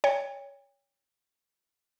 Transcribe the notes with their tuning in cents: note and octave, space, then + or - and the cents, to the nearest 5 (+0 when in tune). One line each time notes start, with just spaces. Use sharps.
C#5 +15 G5 +40